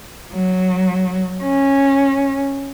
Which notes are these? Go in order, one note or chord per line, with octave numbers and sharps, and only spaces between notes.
F#3
C#4